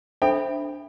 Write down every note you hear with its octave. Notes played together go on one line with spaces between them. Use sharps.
D4 A4 C5 E5 G5 B5